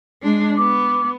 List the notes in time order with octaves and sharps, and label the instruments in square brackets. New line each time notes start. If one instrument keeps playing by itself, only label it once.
[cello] G#3 D4
[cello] B3 [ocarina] D6